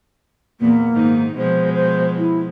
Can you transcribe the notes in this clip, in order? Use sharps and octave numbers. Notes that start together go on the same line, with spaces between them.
E2 A#2 A#3 B3
G#2 D#3 D#4
B2 F3 G#3 C5
C5
E4